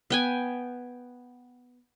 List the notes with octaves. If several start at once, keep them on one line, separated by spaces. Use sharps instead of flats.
B3 G5 G#5